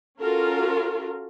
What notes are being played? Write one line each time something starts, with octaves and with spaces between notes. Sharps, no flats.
C#4 F4 F#4 A4 A#4